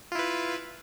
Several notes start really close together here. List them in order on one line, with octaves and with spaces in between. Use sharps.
F4 E4 B4